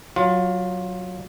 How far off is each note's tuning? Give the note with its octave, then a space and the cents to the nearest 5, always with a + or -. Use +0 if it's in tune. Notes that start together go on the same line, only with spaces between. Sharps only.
F#3 +0 F4 +20